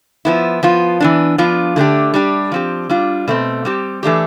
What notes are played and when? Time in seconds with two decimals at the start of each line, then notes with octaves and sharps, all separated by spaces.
0.25 F3 B3 E4
0.63 F3 B3 F4
1.00 E3 B3 D4
1.38 F3 B3 D4 F4
1.76 D3 A3 D4 G4
2.14 G3 D4 G4
2.52 F3 C4 G4
2.89 G3 D4 F4
3.28 B2 A3 C4
3.65 G3 C4 G4
4.03 E3 A3 D4 G4